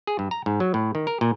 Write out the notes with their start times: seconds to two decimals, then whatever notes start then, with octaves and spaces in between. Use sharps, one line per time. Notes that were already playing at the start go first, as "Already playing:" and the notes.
0.07 G#4
0.19 G2
0.31 A#5
0.46 G#2
0.60 F#3
0.74 A2
0.95 D#3
1.07 A#4
1.21 A#2